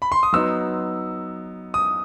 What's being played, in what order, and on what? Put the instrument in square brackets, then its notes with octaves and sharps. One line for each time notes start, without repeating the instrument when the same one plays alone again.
[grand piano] B5
C6
D#6
F#3 B3 D#4 E6
D#6